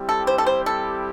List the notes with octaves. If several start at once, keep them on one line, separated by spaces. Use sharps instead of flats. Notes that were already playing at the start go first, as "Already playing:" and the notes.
Already playing: G3 C4 E4 G4
A4
C5
A4
C5
A4